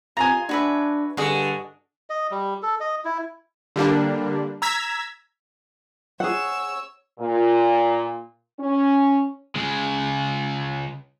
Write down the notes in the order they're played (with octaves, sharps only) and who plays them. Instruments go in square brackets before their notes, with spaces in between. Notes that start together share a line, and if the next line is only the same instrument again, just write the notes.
[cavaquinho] F4 D#5 [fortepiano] G#5 A#5
[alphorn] D4 [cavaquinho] F#4 B4 E5
[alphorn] G2 [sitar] D3 [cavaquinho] F#4 G#4 D#5
[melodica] D#5
G3
A4
D#5
E4
[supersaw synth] D3 G3 A#3 D4
A#5 E6 G#6 B6
[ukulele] G#4 F#5 [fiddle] C#5 E6
[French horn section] A#2
C#4
[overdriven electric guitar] C#3 G#3